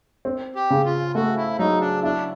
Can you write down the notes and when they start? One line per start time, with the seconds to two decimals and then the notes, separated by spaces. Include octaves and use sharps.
0.25 C4
0.55 G4
0.70 C#3
0.85 F4
1.15 A3 F#4
1.37 E4
1.59 F#3 D#4
1.81 D4
2.03 D4 E4